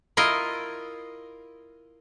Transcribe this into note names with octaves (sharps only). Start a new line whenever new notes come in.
E4 F4 A#4 D#5